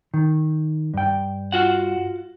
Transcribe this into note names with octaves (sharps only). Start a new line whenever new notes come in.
D#3
G2 G5
F4 F#4 F#5